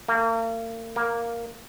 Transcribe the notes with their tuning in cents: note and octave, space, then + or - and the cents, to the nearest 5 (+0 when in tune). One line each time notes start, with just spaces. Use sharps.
A#3 -40
A#3 +0